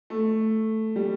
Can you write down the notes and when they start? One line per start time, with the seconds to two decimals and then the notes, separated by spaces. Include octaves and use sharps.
0.10 A3
0.96 G3